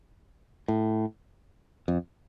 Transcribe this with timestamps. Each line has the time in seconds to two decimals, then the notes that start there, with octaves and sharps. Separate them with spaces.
0.68 A2
1.88 F2